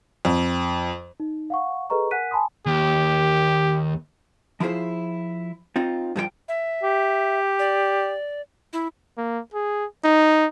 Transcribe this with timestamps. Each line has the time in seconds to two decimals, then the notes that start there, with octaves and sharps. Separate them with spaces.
0.25 F2
1.20 D#4
1.50 F5 F#5 C#6
1.90 G#4 A4 B4 D#5 A#5 C#6
2.11 A#4 F#5 G#5 F#6 B6 D#7
2.31 G#5 A5 B5 C6 D#6
2.66 D#2 G4
4.60 F3 E4 F4 G4 G#4 C5
5.76 C4 D#4 F4
6.16 G2 F3 G#4 G5
6.48 E5
6.83 G4
7.59 D5
8.73 E4
9.18 A#3
9.54 G#4
10.05 D#4